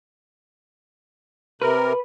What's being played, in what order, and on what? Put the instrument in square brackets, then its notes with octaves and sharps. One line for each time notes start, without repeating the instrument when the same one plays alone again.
[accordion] C3 A#4 [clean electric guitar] B4